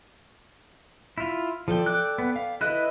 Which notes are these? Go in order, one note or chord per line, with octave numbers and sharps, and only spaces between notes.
E4 F4
F3 A4 D5 G5
D6 F#6
B3
F5
E4 B4 D#5 F#6